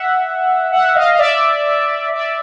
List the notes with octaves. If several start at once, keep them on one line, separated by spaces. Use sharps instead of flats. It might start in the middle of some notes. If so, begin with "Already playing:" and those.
Already playing: E5 F#5
E5 F#5
D#5 F5
F5
D5 E5
D5 E5